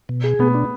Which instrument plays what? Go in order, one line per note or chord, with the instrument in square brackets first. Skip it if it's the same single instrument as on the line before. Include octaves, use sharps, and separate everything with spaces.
[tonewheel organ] B2
G#4
[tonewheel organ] B2 [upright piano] B3
[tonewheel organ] D4